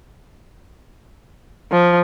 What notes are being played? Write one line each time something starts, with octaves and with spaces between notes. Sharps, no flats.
F3